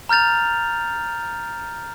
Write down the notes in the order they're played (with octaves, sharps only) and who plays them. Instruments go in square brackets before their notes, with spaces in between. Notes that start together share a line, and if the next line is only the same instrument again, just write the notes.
[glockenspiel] A#5 F6 G6 A6 F7